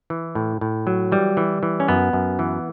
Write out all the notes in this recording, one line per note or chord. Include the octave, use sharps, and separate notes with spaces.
E3
A2
A2
F#3
E3 G3
E3
E3
C#4
F#2 B3
F#2
E3